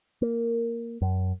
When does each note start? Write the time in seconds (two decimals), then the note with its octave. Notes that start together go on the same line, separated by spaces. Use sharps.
0.22 A#3
1.02 F#2